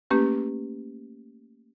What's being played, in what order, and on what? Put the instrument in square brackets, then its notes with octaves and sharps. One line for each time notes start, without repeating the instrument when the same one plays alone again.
[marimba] A3 A#3 C#4 G4 B4